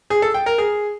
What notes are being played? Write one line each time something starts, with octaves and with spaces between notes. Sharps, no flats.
G#4
A4
G5
A#4
G#4